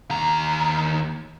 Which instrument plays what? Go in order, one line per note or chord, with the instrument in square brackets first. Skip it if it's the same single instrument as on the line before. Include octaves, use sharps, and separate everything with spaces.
[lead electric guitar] D#2 A#5